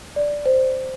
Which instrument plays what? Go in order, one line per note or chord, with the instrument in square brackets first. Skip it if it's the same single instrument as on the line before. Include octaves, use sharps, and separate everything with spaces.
[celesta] D5
[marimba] C5